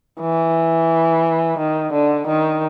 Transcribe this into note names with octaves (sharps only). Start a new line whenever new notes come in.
E3
D#3
D3
D#3